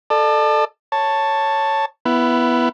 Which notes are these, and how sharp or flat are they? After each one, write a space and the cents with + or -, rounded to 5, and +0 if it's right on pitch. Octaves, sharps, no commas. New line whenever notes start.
A4 +0 D5 +35
C#5 +0 A5 +10
B3 +0 E4 +15